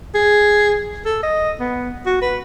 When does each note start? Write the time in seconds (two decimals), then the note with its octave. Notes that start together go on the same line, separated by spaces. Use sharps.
0.15 G#4
1.06 A4
1.23 D#5
1.60 B3
2.06 F#4
2.22 B4